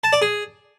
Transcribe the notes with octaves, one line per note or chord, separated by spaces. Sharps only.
A5
D5
G#4